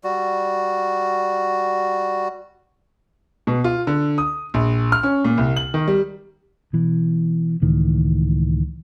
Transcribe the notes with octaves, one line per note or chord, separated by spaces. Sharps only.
G3 F#4
B2
F4
D3
D#6
A#1
F6
C#4
A#2
C2
F#7
D#3
G3
B2 E3
C#2 A2 D#3 E3